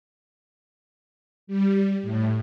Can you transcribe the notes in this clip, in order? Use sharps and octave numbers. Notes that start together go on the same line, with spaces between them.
G3
A2